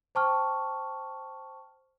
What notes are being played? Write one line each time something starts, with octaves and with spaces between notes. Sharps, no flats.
C5 G5 A5 C#6 D6 F6